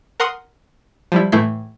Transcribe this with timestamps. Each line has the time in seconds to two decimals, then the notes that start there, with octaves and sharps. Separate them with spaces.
0.20 A#4 F#5 C6 D#6
1.12 F3 G3 E4
1.32 A2 E3 A3 E4 G6 C7